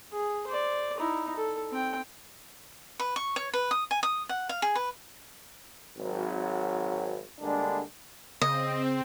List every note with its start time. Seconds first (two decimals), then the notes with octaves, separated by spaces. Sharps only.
0.12 G#4
0.48 C5 D5
0.97 D#4 E4
1.36 A4
1.71 C4 G5
3.00 B4
3.16 C#6
3.36 C#5
3.54 B4
3.71 D#6
3.91 G#5
4.03 D#6
4.29 F#5
4.49 F5
4.62 G#4
4.75 B4
5.97 G#1 F#3
7.41 D3 G3 G#3 A#3 D4
8.41 C#3 C4 D#5